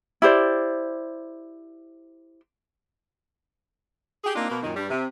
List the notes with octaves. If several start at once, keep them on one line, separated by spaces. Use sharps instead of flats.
E4 G4 C5 D5
G4 G#4
A#3 C4 D4 D#4 F4
B2 A#3
F#2 A#2 D#3
G2 G3
C3